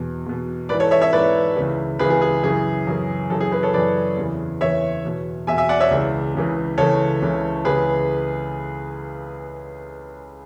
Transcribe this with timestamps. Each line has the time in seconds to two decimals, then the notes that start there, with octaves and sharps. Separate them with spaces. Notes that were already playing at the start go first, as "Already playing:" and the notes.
Already playing: E2 B2
0.26 E2 B2
0.69 G#2 E3 B4 D5
0.80 A4 C#5
0.91 C#5 E5
1.01 C#5 E5
1.13 G#2 E3 B4 D5
1.57 C#2 C#3 E3
1.99 C#2 C#3 E3 G#4 B4
2.10 G#4
2.22 G#4
2.44 F#2 C#3 E3 G#4
2.87 F#2 C#3 E3
3.30 F#2 C#3 E3 A4
3.41 G#4
3.52 G#4 B4
3.63 A4 C#5
3.74 F#2 C#3 E3 B4 D5
4.17 E2 C#3 E3
4.61 E2 C#3 E3 C#5 E5
5.05 E2 B2
5.47 E2 E5 G#5
5.52 B2
5.58 E5 G#5
5.69 D5 F#5
5.80 C#5 E5
5.91 C#2 C#3 E3
6.35 C#2 C#3 E3
6.78 C#2 C#3 E3 A4 C#5
7.22 C#2 C#3 E3
7.65 C#2 C#3 E3 G#4 B4